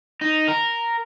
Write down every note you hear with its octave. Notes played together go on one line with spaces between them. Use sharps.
D#4
A#4